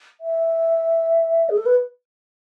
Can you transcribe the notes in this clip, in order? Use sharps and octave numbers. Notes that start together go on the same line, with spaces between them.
E5
G#4
A4
B4